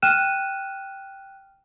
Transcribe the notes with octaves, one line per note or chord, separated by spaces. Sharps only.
G5 F6 F#6 D#7 E7